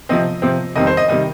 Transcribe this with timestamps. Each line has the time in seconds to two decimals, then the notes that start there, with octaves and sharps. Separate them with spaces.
0.09 C3 F3 C4 D#5
0.42 C3 F3 C4
0.76 F2 D#3 G3 C4 D#5
0.87 C5
0.97 D#5
1.08 C3 D#3 G3 D#5